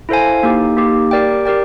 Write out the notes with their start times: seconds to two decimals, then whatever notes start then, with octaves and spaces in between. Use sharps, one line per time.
0.09 E4 A4 C5 F5 G#5
0.43 A#3 D#4 G4
0.77 A#3 D#4 G4
1.11 G4 A#4 D5 G5
1.45 G4 A#4 D5 G5